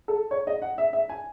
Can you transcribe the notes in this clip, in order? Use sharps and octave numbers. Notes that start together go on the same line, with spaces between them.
A4
C#5
D#5
F#5
E5
E5
G#5